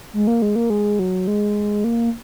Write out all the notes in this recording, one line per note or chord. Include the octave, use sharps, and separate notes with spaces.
G#3
A#3
G#3
A#3
G#3
F#3
G#3
A#3